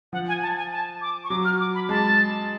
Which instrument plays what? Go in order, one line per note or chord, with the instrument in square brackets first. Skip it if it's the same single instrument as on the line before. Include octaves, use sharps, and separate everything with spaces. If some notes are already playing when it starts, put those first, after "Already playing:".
[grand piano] F3 [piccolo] F#5
[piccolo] G#5
A5
G#5
A5
D6
C#6
[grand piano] F#3 [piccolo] D6
[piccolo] F6
D6
B5
[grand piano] G#3 [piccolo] A5